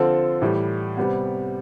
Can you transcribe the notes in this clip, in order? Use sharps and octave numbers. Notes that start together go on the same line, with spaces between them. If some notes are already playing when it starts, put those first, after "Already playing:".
Already playing: D3 F3 C4 F4 A4
A2 E3 G3
C3 G3 B3